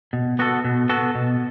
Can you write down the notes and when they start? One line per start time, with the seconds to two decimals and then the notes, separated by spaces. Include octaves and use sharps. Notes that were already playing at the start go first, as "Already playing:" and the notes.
0.13 B2
0.39 B3 F#4 A4
0.64 B2
0.89 B3 F#4 A4
1.15 B2